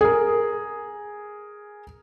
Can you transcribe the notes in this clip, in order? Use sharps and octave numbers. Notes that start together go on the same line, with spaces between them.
G#4 A#4